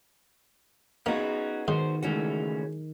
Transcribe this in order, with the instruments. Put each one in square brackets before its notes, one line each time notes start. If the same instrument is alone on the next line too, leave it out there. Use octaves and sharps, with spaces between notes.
[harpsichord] A#3 [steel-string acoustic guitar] B3 G#4 [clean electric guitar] C#4 D#4 F#4
[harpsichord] G#2 [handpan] D#3 [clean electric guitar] F#4 C5
[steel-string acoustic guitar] C#3 E3 G#3 [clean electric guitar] A3 C#4 F#4